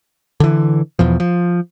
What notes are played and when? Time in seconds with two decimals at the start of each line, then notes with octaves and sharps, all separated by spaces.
0.40 D3 E3
0.99 E2 B2 F3
1.20 F3